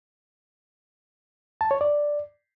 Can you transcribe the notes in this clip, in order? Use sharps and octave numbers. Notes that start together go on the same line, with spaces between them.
A5
C#5
D5